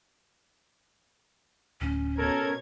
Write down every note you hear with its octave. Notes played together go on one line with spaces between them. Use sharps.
D1 C#4
B2 A4 A#4 C#5 G#6